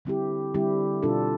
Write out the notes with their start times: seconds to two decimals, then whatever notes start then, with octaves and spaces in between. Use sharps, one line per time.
0.05 D3 G3 C4 E4 G4
0.54 D3 G3 C4 E4 G4
1.03 B2 G3 D4 F4 A4